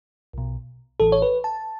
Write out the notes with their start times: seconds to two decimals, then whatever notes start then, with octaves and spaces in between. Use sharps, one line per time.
0.33 B1 B2
1.00 A1 A2 E3 A4
1.12 C#5
1.22 B4
1.44 A5